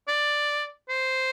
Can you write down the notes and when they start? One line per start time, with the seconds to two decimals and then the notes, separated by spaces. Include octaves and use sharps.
0.08 D5
0.89 C5